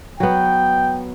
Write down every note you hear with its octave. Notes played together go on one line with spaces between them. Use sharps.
F#3 B3 G5